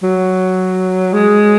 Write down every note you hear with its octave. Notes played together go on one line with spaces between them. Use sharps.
F#3
G#3